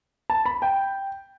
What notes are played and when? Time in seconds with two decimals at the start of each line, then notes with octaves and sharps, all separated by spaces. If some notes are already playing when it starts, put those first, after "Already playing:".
0.30 A5
0.46 B5
0.62 G5